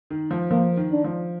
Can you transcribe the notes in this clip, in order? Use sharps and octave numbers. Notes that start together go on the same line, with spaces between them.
D#3
F3
F3 A#3
D#3
D4
F3